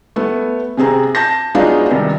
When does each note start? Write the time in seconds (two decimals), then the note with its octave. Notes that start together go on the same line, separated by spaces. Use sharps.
0.16 A3 B3
0.77 C3 C4 G#4 A#5
1.15 A5 G6 A#6
1.54 F#3 G#3 B3 D4 D#4 F4
1.90 G2 C3 D#3